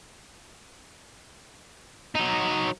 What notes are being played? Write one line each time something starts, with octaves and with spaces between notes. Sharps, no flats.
F#3 D#4